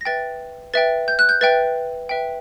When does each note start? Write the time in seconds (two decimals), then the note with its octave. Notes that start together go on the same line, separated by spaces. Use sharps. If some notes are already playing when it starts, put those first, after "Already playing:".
0.01 A#6
0.05 B4 E5 G5 A6
0.74 B4 E5 G5 A6
1.08 G6
1.19 F#6
1.29 G6
1.41 B4 E5 G5 A6
2.09 B4 E5 G5